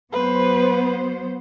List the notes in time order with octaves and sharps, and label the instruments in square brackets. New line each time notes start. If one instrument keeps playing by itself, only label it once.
[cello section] F#3 B3 C5 [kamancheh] B4